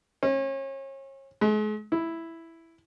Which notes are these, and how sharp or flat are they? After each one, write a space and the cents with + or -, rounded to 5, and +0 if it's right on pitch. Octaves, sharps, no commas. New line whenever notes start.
C#4 -35
G#3 +40
E4 +0